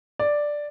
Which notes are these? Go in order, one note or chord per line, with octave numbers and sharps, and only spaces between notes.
D5